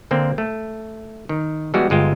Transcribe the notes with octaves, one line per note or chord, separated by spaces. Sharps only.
D3 A#3 C4
A3
D#3
E3 G3 G#3 B3 F#4
G1 G#3 F4 G5